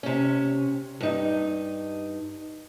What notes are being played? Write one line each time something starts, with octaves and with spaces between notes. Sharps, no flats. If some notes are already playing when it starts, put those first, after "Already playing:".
C3 C#4
G2 D#4